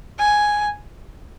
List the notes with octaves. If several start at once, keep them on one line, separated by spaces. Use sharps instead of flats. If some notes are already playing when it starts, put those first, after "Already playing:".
G#5